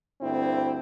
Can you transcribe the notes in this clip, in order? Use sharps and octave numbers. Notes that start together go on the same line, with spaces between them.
D2 G2 C4 E4